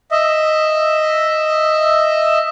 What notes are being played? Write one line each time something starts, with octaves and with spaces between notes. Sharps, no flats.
D#5 E5